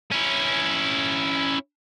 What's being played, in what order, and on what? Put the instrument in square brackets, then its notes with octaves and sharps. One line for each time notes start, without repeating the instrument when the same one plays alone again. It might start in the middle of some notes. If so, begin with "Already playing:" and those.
[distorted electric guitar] C#4 E4